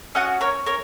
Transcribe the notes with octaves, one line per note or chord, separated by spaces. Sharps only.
C#4 F#4 D#5 F#5
A#4 C#5
A#4 C#5